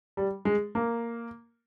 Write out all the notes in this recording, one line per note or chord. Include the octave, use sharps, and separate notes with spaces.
G3
G#3
A#3